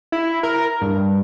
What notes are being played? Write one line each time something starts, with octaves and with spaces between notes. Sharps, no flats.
E4
A#4
G2